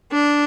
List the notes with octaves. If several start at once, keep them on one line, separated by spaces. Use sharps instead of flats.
D4